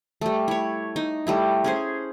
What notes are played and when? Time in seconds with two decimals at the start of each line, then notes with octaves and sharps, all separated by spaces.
0.21 G3 A3
0.48 E4 C#5
0.96 D#4
1.27 G3 A3 E4
1.64 C#4 G#4 C5